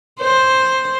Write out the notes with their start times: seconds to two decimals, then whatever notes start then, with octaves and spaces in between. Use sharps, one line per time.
0.21 C5